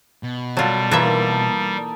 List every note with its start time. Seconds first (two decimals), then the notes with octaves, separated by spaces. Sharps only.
0.23 B2
0.57 F#3 G3 F4 A4
0.91 E3 A#3 D#4 F4 A4 E5